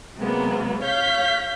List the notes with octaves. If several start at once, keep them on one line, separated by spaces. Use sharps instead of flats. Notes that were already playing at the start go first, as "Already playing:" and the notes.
C3 F#3 G#3 A#3 B3
C#5 F5 G6 B6